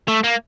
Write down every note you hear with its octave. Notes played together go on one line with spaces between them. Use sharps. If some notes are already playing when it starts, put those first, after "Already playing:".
A3
A#3